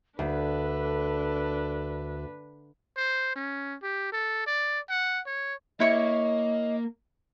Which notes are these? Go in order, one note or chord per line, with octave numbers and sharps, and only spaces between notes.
D2 D4 A4 B4
C5
C#4
G4
A4
D5
F#5
C#5
A#3 E4 C#5 D#5 C#6